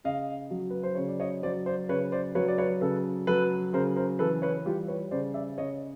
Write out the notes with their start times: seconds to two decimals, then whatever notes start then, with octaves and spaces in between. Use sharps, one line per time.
0.04 C#3 D#5 F5
0.51 F#3
0.70 B4
0.83 C5
0.95 C#3 C#5
1.08 D5
1.20 C#5 D#5
1.43 F#3 C5 D5
1.66 C5 D5
1.89 C#3 B4 C#5
2.12 C5 D5
2.35 F#3 B4 C#5
2.48 D5
2.58 B4 C#5
2.81 C#3 A4 B4
3.27 F#3 A4 B4
3.73 C#3 A#4 C5
3.96 A#4 C5
4.19 E3 A4 B4
4.42 B4 C#5
4.65 G3 F4 G4
4.88 B4 C#5
5.11 C#3 C5 D5
5.34 D5 E5
5.58 C#3 C#5 D#5